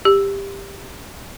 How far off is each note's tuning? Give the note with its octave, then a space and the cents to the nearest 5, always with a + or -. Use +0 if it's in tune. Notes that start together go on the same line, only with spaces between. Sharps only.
G4 +15